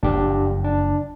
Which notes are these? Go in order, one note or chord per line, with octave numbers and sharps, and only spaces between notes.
F#1 F2 D4 G4
D4